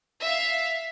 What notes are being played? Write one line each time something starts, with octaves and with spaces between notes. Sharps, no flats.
E5 F5